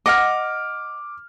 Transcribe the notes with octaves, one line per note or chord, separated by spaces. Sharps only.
D#5 F#5 D6 F6